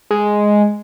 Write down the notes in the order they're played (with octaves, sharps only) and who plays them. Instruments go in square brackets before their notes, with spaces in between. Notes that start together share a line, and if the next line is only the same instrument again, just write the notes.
[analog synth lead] G#3